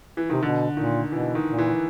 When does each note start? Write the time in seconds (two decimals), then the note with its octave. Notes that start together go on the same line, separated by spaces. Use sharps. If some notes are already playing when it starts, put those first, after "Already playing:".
0.17 E3
0.30 C3 D#3
0.42 B2 D3
0.77 A#2 D#3
1.12 B2 E3
1.35 D#3
1.47 A#2
1.58 E3